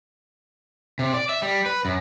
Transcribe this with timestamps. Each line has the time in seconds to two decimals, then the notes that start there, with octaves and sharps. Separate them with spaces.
0.99 C3
1.14 D5
1.29 E5
1.42 G3
1.66 B4
1.85 F#2